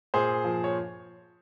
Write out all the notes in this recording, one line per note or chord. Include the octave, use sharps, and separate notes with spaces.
A#2 G#4 C5
F3
C#5